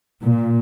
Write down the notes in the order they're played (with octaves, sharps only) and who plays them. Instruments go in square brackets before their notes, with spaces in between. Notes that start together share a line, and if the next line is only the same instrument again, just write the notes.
[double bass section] A#2